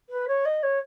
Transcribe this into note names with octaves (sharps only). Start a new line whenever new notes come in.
B4
C#5
D#5
C#5